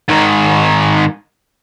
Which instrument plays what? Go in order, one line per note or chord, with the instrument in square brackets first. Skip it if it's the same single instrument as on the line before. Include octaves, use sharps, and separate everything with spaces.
[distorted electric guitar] G#2 D#3